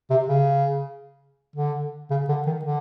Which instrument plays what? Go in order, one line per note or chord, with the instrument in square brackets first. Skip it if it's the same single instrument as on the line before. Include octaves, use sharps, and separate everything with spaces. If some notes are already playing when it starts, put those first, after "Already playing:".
[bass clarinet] C3
C#3
D3
C#3
D3
D#3
D3